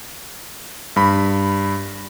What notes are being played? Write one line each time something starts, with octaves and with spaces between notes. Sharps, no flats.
G2 B5